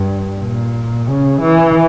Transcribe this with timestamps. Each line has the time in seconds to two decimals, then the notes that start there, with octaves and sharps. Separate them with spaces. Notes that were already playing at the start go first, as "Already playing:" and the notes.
Already playing: G2
0.39 A#2
1.08 C#3
1.41 E3